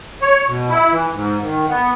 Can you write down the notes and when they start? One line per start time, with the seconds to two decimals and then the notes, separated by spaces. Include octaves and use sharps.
0.22 C#5
0.47 B2
0.69 E4
0.92 E3
1.13 G#2
1.42 D#3
1.69 B3